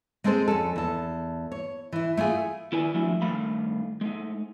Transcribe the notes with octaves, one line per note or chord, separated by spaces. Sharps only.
G#3 C4 G#4 A4 C5
F2 C#4 A4
E2 A4
C#5
E3 E4
A3 E4 F4 G#4
D#3 E4 B4 D5 G#5
F3 G#3 A3 D4 E4 F#4
G2 D#3 A3 F5 B5
G#3 A3 D#4